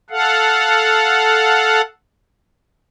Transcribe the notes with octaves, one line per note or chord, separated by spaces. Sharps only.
A4 F5 F#5